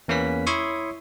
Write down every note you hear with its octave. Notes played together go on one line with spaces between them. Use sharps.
E2 A#3 C#4 B4 B6
E4 C#5 E5 C6 C#6 D#6